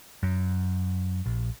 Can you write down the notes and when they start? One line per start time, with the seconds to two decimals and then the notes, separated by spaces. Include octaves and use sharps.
0.23 F#2
1.26 A#1